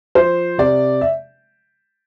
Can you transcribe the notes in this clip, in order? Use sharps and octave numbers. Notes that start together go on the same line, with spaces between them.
F3 C5
C3 D5
E5